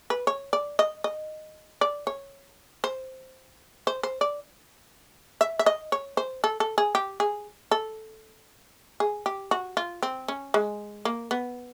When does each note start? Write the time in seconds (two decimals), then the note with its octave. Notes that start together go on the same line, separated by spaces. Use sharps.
0.10 B4
0.27 C#5
0.53 D5
0.79 D#5
1.04 D#5
1.81 D5
2.07 C#5
2.84 C5
3.87 C5
4.03 C5
4.21 D5
5.41 E5
5.59 E5
5.66 D#5
5.92 C#5
6.17 C5
6.44 A4
6.60 A4
6.78 G#4
6.95 G4
7.20 G#4
7.71 A4
9.00 G#4
9.26 G4
9.51 F#4
9.77 F4
10.03 C4
10.28 C#4
10.54 G#3
11.05 A#3
11.31 B3